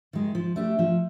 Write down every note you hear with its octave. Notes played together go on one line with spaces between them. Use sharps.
D#3 G#3
F3
A3 D4 G4
F3